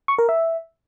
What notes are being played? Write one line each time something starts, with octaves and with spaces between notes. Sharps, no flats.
C#6
A#4
E5